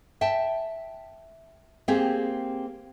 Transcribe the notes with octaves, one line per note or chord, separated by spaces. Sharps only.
E5 G5 A5
A#3 C4 G4 G#4